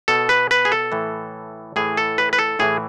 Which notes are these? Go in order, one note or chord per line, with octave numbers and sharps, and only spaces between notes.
B2 A4
B4
B4
G#4
A4
A2 E3
A2 E3 G#4
A4
B4
B4
A4
A2 E3 G#4